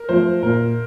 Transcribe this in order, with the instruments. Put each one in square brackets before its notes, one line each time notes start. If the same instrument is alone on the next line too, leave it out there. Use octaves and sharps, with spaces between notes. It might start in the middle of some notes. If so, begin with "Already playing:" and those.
Already playing: [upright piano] A#4
[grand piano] F3 A3 [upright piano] C5
[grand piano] A#2 [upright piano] A#4